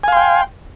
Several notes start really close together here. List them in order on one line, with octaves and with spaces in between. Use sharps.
G#5 F5 C6 G5